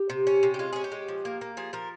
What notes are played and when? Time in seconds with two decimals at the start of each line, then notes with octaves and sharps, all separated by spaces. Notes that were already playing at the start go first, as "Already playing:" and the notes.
Already playing: G4
0.10 C3
0.27 C#4
0.43 C3
0.54 G4
0.59 G#3 F4
0.73 C#4 G#4
0.84 G4
0.92 G#3
1.08 F3
1.25 A#3
1.41 A#3
1.57 F3 G#4
1.73 F3 A#4